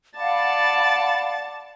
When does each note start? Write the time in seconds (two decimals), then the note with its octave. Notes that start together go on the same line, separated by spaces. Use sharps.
0.16 D5 F5 F#5 A5 B5